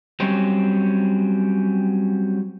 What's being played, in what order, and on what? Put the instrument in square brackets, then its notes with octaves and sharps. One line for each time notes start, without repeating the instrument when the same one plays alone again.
[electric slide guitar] F#3 G3 C4 C#4